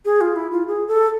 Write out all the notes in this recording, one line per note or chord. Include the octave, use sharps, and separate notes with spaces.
G#4
F4
E4
F4
G#4
A4